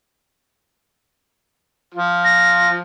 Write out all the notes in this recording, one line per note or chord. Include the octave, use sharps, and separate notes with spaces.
F3 F4
A#6